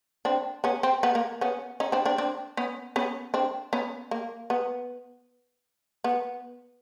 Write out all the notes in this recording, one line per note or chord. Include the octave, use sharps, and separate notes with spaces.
C4 D4
B3 C#4
C4
B3
A#3
B3 C#4
C#4 D#4
C4 D4
C4 D4
C4 D4
B3 C#4
B3 C#4
C4 D4
B3 C#4
A#3
B3
B3